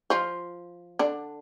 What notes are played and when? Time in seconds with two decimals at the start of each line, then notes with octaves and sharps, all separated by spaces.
0.10 F3 F4
0.99 D3 D4